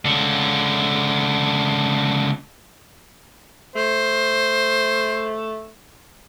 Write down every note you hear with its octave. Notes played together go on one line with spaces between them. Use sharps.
C#2 D3
A3 C5